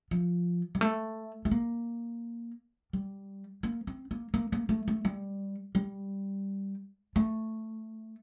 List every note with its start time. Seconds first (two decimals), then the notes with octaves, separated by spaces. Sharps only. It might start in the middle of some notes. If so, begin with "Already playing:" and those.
0.11 F3
0.75 G3
0.81 A3
1.45 A3
1.51 A#3
2.93 G3
3.63 A#3
3.87 C4
4.11 A#3
4.34 A#3
4.52 A#3
4.69 A3
4.88 A3
5.05 G3
5.75 G3
7.16 A3